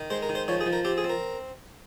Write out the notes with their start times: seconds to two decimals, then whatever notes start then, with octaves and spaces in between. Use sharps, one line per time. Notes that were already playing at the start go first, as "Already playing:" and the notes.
Already playing: D#3
0.10 G#3 C5
0.23 A#4
0.29 D#3
0.35 C5
0.48 F3 C#5
0.61 G#4
0.66 F3
0.73 A#4
0.85 C4 G4
0.98 G#4
1.04 C4
1.09 A#4